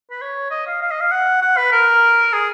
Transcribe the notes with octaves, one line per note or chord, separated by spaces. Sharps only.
B4
C#5
D#5
F5
F5
D#5
F5
F#5
F#5
B4
A#4
G#4